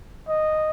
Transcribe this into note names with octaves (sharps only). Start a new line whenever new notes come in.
D#5